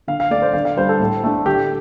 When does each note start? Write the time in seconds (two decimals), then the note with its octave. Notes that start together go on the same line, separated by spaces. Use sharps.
0.08 D3 F5
0.20 F5
0.30 A3 D4 D5
0.42 C5
0.53 D3 F5
0.65 F5
0.77 G3 D4 C5
0.89 A4
1.00 A2
1.24 A3 D4
1.46 D3 G4